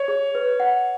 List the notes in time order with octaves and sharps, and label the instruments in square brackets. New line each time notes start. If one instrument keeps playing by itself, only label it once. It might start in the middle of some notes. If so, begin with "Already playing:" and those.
Already playing: [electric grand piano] C#5
[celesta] G#4
B4
F#5